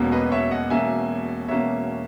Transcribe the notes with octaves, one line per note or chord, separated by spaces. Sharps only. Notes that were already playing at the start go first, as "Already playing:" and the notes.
Already playing: E1 E2 B2 A#3 C#4
B4 D#5
C#5 E5
D#5 F#5
E1 E2 B2 A#3 C#4 E5 G#5
E1 E2 B2 A#3 C#4 C#5 E5